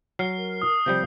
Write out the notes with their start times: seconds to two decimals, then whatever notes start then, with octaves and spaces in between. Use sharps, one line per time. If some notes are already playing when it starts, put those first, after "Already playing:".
0.19 F#3 F6 C7
0.37 A#4
0.62 D#6
0.86 C3 F3 G3 G6